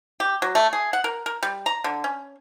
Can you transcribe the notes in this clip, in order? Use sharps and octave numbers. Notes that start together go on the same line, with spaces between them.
G4
F#3
A3
G#4
F#5
A#4
A#4
G3
A#5
D3
C#4